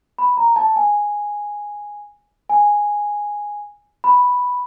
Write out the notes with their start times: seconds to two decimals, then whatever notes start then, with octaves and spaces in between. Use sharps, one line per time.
0.18 B5
0.37 A#5
0.56 A5
0.76 G#5
2.49 G#5
4.04 B5